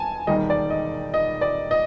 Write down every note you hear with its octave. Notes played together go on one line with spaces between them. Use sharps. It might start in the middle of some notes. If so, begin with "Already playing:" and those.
Already playing: G#5 A5
E1 D#2 D#3 G3 D#5
D5
D#5
D#5
D5
D#5